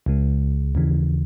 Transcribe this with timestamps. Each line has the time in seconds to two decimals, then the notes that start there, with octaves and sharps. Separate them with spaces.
0.06 C#2 C#3 G#3
0.75 D#2 C#3 E3